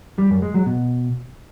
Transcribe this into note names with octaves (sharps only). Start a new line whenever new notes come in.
G3
F#2
G#3
F#3
B2